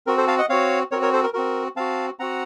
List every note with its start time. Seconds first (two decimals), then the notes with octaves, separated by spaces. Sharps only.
0.07 C4 F#4 A#4
0.17 A4 C5
0.28 F5 A5
0.38 D#5 F#5
0.49 C4 F#4 C#5 F5
0.91 C4 A#4 C#5
0.96 F#4
1.02 A#4 C#5
1.13 A4 C5
1.23 A#4
1.34 C4 F#4 A#4
1.76 C4 F#4 F5 A5
2.19 C4 F#4 F#5 A#5